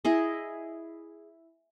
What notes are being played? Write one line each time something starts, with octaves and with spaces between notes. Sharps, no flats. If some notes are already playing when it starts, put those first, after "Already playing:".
E4 G#4 D#5